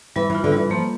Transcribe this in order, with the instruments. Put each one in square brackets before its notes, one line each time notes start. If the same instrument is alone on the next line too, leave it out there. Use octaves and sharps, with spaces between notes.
[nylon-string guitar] E3 [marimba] G3
[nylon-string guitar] E3
[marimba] F4
[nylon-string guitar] D3
[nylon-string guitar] E3 [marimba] G3
[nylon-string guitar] F3 [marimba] A#3